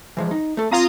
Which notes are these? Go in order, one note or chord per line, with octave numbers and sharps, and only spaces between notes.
E3 F3 G#3
D#4
A3 A4
C4 F4 F5 A#5 D#6